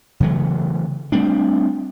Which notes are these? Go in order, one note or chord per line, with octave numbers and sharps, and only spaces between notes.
C#3 E3 F#3 A3
G3 A3 C4 D4